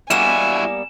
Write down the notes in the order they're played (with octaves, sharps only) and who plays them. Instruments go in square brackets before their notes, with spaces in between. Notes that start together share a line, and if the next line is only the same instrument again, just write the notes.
[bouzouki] G3 A#3 B3 [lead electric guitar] E4 F#4 [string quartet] G#5 [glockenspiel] E7